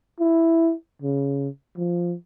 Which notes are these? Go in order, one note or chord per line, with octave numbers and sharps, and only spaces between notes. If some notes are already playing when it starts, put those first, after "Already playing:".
E4
C#3
F3